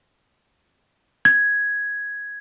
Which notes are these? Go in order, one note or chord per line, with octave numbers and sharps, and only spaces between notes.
G#6